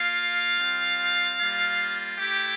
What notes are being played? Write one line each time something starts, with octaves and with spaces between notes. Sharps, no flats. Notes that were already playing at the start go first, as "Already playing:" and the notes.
Already playing: A#3 F4 F5
G3 C4 F4
G3 A#3 F4
A3 E4 G4